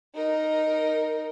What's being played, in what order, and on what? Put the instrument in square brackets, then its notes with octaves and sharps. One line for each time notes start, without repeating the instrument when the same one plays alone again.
[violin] D#4 A#4